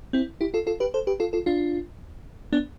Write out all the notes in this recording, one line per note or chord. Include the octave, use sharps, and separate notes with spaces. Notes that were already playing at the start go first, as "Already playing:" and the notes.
C4 E4
E4 G4
F4 A4
F4 A4
G4 B4
A4 C5
G4 B4
F4 A4
F4 A4
D4 F4
B3 D4